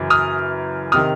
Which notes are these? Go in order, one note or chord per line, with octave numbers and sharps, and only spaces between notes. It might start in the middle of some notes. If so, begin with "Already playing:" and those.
Already playing: F#2 C#3 E3
D#6 F6
C3 D#3 D#6 F6